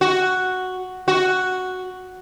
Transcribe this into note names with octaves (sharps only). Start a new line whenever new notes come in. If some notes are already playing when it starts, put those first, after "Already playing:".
F#4
F#4